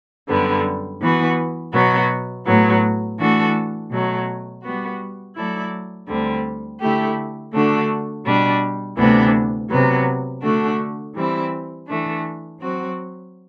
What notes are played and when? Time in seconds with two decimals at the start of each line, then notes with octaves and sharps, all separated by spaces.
0.28 F#2 D3 G3 B3
1.00 E3 B3 F#4 B4
1.73 B2 F#3 B3 F#4
2.46 A2 F#3 B3
3.18 E3 A3 D4 F#4 A4
3.90 B2 F#3 A3
4.63 G3 B3 F#4
5.35 F#3 A3 E4 A4 D5
6.07 D2 D3 G3 C4
6.80 D3 A3 E4 G4
7.52 D3 A3 D4 F#4
8.24 B2 G3 D4
8.97 D2 C3 E3 B3 D4
9.70 C3 F#3 B3
10.42 D3 A3 D4 F#4
11.14 E3 G3 C4 E4
11.87 E3 A3 D4
12.59 F#3 C4 F#4